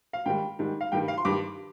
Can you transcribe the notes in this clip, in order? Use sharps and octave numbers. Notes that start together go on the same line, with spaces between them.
F5
G#2 D#3 G3 G5
G#2 D#3 G3
F5
G2 D#3 G3 G5
F5
C6
G2 D#3 G3 D6